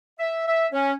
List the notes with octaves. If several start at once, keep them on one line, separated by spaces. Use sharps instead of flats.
E5
E5
C#4